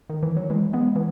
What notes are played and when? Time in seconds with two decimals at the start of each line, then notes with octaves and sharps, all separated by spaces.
0.10 D#3
0.23 E3
0.37 F#3
0.50 E3 G#3
0.73 G#3 B3
0.96 E3